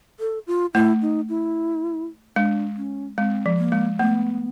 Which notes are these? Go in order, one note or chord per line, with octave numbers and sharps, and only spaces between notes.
A4
F4
A3 E4
D#4
E4
G#3 D4
C#4
G#3 C4
F3
A#3
G#3
A3 B3